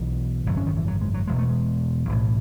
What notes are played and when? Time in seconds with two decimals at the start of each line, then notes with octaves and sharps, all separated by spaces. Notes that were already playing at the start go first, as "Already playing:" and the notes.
Already playing: B1 B2 E3
0.46 G#1 F#2 C#3 F#3
0.57 C#4
0.67 D#3
0.77 E3
0.88 F#3
1.01 G#3
1.14 F#3
1.28 E1 E2 B2 G#3
1.39 A3
1.49 G#3
2.09 B1 A2 E3